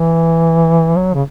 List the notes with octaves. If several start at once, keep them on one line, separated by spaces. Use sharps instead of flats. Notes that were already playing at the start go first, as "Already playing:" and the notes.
Already playing: E3
F#3
C#3